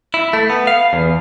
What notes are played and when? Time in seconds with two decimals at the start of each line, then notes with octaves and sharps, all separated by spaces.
0.14 E4
0.33 A3
0.50 B3
0.67 F5
0.93 E2